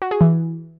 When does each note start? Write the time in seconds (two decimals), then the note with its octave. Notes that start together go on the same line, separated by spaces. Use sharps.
0.02 F#4
0.11 G#4
0.21 E3